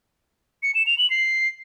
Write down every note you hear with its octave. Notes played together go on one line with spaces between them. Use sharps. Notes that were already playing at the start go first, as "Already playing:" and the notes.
C#7
E7
F7
F#7
C7